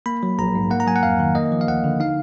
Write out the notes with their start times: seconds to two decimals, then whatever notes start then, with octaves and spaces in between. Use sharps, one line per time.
0.06 A#3 B5
0.23 F#3
0.39 A#1 A#5
0.55 G#2
0.70 A#3 F#5
0.80 A#5
0.87 F#3 G#5
0.96 F#5
1.03 F2 F5
1.19 D#3
1.35 A#3 D#5
1.52 F3
1.61 F5
1.68 D2 F#5
1.84 D3
2.00 D#4 F5